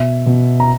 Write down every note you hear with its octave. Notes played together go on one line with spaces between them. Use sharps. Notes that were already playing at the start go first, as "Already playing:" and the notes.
Already playing: B2 E5
B2
A#5